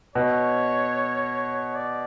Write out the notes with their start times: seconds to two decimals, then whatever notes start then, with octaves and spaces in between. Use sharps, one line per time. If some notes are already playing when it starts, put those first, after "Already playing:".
0.15 B2 C#5
1.75 D5